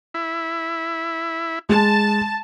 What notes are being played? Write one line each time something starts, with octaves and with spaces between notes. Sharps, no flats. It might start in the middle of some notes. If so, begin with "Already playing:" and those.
E4
G#3 A5